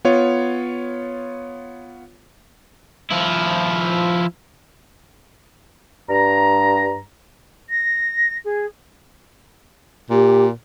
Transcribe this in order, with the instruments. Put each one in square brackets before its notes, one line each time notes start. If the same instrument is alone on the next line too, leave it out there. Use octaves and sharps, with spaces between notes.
[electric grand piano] B3 F4 C#5
[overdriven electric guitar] F3 E4
[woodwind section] G2 A#5
[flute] A#6
G#4
[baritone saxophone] A#2 [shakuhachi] G4